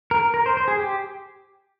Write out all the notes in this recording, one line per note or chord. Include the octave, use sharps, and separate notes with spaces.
A#4
A#4
C5
C5
G#4
G4